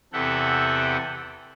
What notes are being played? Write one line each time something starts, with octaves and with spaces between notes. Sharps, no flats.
E2 C3 A4 E5 F#5 G5